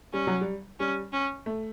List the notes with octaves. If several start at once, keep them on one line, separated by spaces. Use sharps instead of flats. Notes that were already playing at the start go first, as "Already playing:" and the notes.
G3 C#4
F#3
G3
G3 C#4
C#4
A3